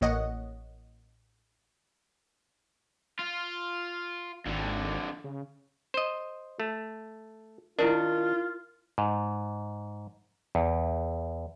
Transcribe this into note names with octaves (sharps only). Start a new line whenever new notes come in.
A1 A#3 C#5 D#5 F#5
F4
G#1 F2 D3
C#3
C5 D#5
A3
D#3 D4 E4 F4 A#4
G#2
E2